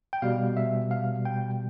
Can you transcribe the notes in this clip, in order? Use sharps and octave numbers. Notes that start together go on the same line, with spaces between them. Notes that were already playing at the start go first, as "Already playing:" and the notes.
G5
B2 G3 F5
E5
F5
G5